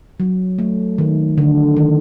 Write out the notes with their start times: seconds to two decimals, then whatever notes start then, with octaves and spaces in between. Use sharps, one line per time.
0.20 F#3
0.59 A3
0.98 D#3
1.38 D3
1.77 D#3